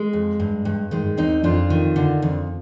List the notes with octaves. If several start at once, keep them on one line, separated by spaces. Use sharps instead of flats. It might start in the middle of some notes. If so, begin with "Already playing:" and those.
Already playing: G#3
F2
G2
G2
D#3 G#3
D#2 C4 D#4
F2 D4 F4
D#3
D3
F2